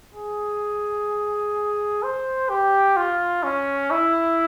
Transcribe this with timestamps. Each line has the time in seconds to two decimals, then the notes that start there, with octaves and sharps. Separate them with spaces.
0.15 G#4
2.03 C5
2.49 G4
2.97 F4
3.43 C#4
3.91 E4